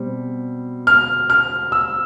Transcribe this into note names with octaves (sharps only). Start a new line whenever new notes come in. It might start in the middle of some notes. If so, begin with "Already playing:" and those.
Already playing: B2 G3 C4
F6
F6
E6